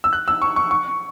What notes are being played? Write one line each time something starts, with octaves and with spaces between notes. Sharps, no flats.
E6
F#6
E6
C#6
C#6
C#6